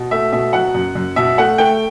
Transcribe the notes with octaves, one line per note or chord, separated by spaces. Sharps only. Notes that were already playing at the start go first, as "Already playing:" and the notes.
Already playing: B2
A3 E5
B2 E5
F#3 F#5
F#2
F#2
B2 E5
A3 F#5
A3 G5